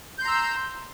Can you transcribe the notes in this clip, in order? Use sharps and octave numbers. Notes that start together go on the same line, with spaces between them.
A#5 C6 E6 G6